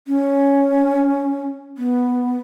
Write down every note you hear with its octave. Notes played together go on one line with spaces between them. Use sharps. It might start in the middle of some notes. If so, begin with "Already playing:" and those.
C#4
B3